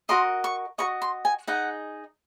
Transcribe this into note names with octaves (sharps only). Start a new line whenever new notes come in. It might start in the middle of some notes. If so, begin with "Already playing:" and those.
F#4 A#4 D#5 C6
C#6
F#4 A#4 D#5 C#6
C6
G#5
D#4 G#4 D#5 F#5